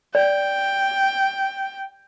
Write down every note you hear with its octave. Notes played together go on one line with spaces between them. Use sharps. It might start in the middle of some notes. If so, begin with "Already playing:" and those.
D5 G5